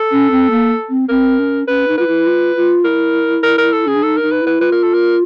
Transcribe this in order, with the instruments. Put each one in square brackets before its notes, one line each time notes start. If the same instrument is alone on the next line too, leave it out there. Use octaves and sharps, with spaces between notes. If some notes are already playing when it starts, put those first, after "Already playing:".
Already playing: [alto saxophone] A4
[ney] C#4
C4
A#3
C4
[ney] C4 [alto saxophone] A#4
[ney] C#4
[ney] C#4 [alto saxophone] B4
[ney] D#4
[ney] F4 [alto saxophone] B4
[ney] E4
F4
F4
[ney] E4 [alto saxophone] A#4
[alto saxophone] A#4
A#4
A4
[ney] C#4 [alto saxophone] G#4
[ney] D4
[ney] D#4 [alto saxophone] A4
[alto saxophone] A#4
[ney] D#4
[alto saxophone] B4
[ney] E4
[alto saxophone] B4
[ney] F4 [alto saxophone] B4
[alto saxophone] A#4
A4
A#4